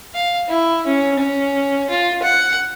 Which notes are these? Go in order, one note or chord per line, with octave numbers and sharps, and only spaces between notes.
F5
E4
C#4
C#4
F4
F#5